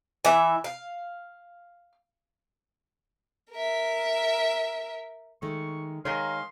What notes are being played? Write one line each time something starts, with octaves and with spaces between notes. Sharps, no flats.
E3 E5
F5
A#4 E5
D#3 G#3 A3 C#6
D#3 G#3 A#4 C#5 F5 C6